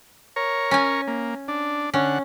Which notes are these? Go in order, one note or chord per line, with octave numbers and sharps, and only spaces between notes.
A#4 C#5
C#4 G#5
A#3
D4
D3 C#4 F#5